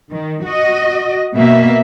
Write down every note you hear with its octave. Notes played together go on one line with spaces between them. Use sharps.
D#3
F#4 D#5
B2 A#3 E5